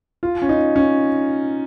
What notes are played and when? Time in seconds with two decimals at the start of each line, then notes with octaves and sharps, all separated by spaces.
0.23 F4
0.42 C#4
0.49 D#4
0.76 C#4